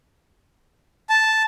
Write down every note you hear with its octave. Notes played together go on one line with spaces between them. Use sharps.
A5